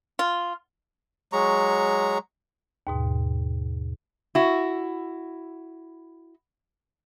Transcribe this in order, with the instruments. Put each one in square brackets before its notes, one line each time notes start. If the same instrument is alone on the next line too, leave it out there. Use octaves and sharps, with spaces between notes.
[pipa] F4
[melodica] F#3 G#3 A#5 C#6
[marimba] D#2 G#2 B2
[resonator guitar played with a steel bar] E4 F#4